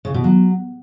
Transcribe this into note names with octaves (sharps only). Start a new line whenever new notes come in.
C#3
B2
F#3